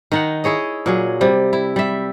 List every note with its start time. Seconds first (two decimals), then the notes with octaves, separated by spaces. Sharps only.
0.12 D#3 D#4 F#5
0.44 E4 G#4 C#5 D#5
0.86 A#2 F#3 G#4
1.21 C3 G3
1.53 E4
1.76 G3 E5